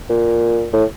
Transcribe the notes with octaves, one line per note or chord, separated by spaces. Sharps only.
A#2
A2